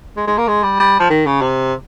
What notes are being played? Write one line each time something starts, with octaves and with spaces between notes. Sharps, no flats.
G#3
G#3
A#3
G#3
G3
G3
F3
D#3
C#3
C3